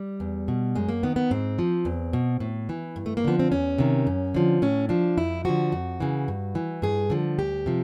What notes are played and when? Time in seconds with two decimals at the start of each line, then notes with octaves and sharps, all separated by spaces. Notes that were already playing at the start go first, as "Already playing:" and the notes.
Already playing: G3
0.20 E2
0.48 B2
0.75 F#2 G#3
0.89 A#3
1.03 D#3 B3
1.16 B3
1.31 G#2 C4
1.59 F3
1.85 E2
2.13 B2
2.40 A2
2.69 E3
2.96 G2
3.06 A3
3.17 A#3
3.24 D3 F3 B3
3.39 C4
3.52 E2 C#4
3.78 C3 D#3
4.07 F#2
4.34 D3 F3
4.62 A2 C#4
4.89 F3 D4
5.17 F2 E4
5.45 D3 F3 F#4
5.72 F2
6.00 C#3 E3
6.28 G2
6.55 E3
6.82 G2 G#4
7.10 D3 F3
7.39 D2 G4
7.66 C3 F3